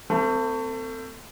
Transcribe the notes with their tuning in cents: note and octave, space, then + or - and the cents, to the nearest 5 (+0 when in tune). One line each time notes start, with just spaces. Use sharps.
A3 +30 C4 -25